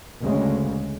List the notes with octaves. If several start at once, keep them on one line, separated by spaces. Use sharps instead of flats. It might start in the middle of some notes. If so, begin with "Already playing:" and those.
D2 C#3 G#3